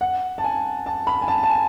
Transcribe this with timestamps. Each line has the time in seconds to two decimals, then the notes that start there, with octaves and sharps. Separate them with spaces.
0.01 F#5
0.38 A5
0.44 G#5
0.86 A5
1.07 B5
1.22 G#5
1.28 A5
1.43 A5
1.50 G#5